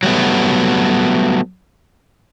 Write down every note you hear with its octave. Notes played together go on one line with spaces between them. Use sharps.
F#3 G3 A3 B3